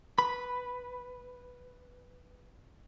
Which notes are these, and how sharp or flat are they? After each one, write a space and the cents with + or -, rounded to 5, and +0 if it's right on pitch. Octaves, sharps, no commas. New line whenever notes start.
B4 +0 B5 +0